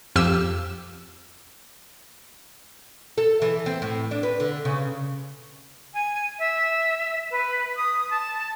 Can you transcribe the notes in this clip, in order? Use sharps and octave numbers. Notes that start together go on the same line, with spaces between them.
F2 G4 E6
A4
E3
C4
A2
D4
B4
D3
C#3
G#5
E5
B4
D#6
A5